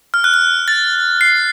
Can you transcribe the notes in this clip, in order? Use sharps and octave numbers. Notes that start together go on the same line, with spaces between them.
F6
F#6
F6
A6
C7